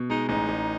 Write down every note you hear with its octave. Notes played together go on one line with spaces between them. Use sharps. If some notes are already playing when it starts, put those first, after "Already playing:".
Already playing: B2
G#3 D#4
A1 D#4
A1